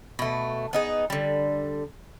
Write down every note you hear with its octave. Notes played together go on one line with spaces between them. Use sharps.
B2 A3
B3 D#4 G#4
D3 G3